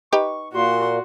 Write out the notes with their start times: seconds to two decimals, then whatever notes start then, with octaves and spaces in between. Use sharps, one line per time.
0.13 D#4 G4 B4 C#6
0.53 A#2 F#4 C6